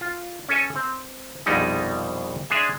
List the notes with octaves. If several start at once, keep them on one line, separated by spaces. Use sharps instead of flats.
F4
C#4 A4 G#5
C4
A#1 F2 B2 G3 G#3 D#4
G#3 D4 G#4 E5